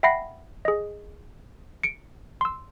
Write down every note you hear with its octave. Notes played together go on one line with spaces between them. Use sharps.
E5 F#5 G5 B5 A#6 C7
G#4 D#5
C#7 D7
C6 E6